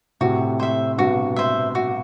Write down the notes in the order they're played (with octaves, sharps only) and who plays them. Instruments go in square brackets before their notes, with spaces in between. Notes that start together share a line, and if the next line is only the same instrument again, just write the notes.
[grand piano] A2 C3 [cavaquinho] F#4
[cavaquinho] C5 E5
[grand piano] G2 B2 [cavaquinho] F#4
[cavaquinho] C5 E5
F#4